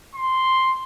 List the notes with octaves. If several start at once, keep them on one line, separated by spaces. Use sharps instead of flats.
C6